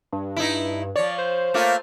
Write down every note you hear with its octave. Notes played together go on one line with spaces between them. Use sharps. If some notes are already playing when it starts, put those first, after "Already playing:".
G2
D#4 E4
F3 C#5 D5
C5
A3 A#3 F4